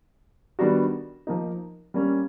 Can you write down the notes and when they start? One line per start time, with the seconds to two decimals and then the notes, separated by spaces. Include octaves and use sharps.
0.59 D#3 G3 B3 D4 F#4
1.27 F3 A#3 D#4
1.94 G3 A#3 C#4